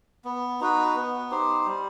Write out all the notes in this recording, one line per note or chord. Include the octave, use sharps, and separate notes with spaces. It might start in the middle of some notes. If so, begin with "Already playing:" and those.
B3
D#4 F#4 B4
B3
D#4 G4 C5
G3